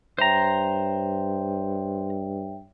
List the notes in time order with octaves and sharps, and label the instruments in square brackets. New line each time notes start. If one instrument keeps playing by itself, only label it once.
[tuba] G2 [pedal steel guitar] C5 A#5 [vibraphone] C#5 E5 G5